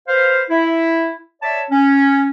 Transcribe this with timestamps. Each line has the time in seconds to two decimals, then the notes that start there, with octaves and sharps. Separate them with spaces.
0.08 B4 C5 F5
0.50 E4 E5
1.42 C#5 D5 E5 A5
1.71 C#4